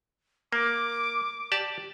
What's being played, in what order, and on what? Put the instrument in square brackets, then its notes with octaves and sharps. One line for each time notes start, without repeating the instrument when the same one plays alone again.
[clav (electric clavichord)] A#3 [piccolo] D6
[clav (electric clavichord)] G4 D5 A5